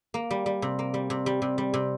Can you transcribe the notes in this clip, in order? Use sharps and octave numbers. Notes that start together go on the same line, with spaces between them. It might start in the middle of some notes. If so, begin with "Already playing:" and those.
A#3
G3
G3
C3
A#3
G3
C3
G3
C3
G3
C3